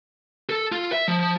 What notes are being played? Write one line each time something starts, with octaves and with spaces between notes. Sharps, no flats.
A4
F4
E5
F3